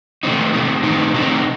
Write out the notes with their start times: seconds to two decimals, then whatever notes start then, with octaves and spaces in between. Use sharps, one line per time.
0.23 C3 D#3 A3 C4 D#4
0.53 C3 D#3 A3 C4 D#4
0.83 C3 D#3 A3 C4 D#4
1.14 C3 D#3 A3 C4 D#4